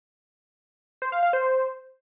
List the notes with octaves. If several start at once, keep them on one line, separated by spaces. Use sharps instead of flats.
C5
F5
F5
C5